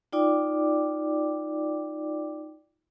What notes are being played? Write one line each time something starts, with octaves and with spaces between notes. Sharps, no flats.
D#4 F4 D5 G5 D6